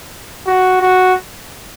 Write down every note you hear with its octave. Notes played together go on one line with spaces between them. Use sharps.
F#4
F#4